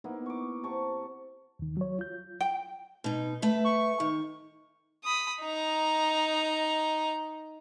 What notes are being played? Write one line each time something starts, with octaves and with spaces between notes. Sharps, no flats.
A#3 B3 D#4 E4
C#6 D6
C3 A5 C#6
D#2 D#3
F#3 C#5
F4 G6
G5
B2 D#4
A3 B4 E5
C#6
D#3
B5 D#6
D#4 A#5